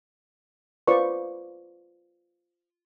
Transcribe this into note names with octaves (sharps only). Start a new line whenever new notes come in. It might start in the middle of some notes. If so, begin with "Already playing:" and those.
F4 B4 C5 D5 C#6